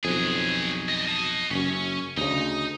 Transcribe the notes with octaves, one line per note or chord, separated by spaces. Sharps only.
B1 F2 F#3 G#4
G3 D#5
D#5 A5
F#1 F#2 C#4
D2 C#3 D#4